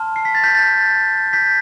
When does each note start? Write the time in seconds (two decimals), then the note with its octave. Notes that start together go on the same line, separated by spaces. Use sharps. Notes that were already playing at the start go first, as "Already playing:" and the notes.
Already playing: A5 C6 F6
0.16 C7
0.25 B6
0.35 A6
0.44 G6 B6
0.55 A6
1.33 G6 B6